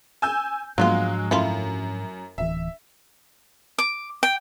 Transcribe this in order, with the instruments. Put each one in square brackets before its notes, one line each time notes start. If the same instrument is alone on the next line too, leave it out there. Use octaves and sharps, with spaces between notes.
[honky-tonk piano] G#5 E6 G6
[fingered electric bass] G#2 F3 D4 [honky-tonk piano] F#3 G#3 [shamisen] A#3 B3 F4
[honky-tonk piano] F#2 [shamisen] A3 E4 F4
[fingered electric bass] D1 E3 [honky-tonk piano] E5
[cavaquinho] D6
G5